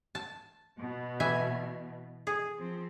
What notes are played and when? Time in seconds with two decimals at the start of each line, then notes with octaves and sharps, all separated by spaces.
0.15 A5
0.80 B2
1.20 E3 E5 G#5
2.27 G#4
2.57 F3 C4